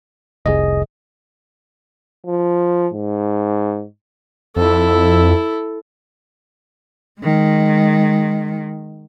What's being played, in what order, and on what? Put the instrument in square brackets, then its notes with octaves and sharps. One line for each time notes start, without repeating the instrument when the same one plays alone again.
[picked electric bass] F1 C2 [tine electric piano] G#4 D#5
[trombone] F3
G#2
[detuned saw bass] F2 [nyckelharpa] E4 A4
[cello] D#3 G#3